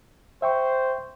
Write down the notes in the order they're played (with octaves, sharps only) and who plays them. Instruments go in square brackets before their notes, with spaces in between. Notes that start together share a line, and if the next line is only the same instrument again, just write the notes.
[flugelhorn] C5 [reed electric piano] E5 G5 C#6